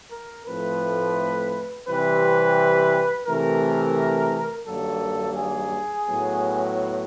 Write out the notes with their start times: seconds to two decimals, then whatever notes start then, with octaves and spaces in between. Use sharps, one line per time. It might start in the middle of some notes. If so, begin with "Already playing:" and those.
0.11 A#4
0.47 A2 F3 A3 C4 B4
1.87 C3 E3 G3 C4 B4
3.27 C3 E3 A3 A#4
4.67 G2 D#3 F#3 A#3 A4
5.37 G#4
6.07 A2 F#3 B3